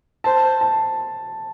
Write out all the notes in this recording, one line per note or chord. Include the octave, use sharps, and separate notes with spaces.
C5 A5
A5